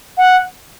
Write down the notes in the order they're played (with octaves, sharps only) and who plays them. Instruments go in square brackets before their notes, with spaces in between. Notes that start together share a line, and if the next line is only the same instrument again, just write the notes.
[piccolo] F#5